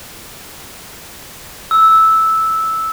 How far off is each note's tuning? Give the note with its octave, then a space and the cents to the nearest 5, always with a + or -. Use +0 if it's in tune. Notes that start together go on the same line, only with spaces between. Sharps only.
E6 -10